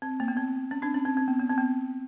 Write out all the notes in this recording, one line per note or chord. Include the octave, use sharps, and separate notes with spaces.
C4
A#3
B3
C4
C#4
C4 D4
C#4
C4
C4
B3
B3
C4
B3